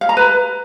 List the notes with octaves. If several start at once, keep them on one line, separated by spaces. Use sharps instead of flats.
F5
A#5
B4